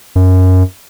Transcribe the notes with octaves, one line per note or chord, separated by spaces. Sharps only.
F#2